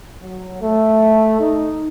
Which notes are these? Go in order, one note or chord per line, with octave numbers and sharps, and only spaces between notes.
F#3
A3
D#4